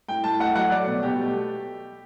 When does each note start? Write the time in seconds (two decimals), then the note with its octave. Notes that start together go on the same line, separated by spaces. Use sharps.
0.08 A2 G5
0.24 A2 A5
0.39 A3 F#5
0.55 F#3 F#5
0.71 A3 D5
0.87 B2
1.03 B2 G4
1.19 A3